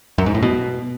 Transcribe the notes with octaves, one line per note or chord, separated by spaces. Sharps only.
F#2
G#2
A2
B2